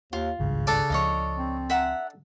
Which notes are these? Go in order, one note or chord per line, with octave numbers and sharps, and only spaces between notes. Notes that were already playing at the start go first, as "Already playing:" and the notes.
D#2 F4
G#1 C#2 G2 C#3
D4 A4 D5
C#2 F3 C#5 D#5 F5
C4
E5 F#5 A#5